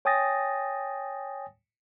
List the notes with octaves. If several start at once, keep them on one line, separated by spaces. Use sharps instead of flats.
C#5 G5 G#5 D#6 A6 A#6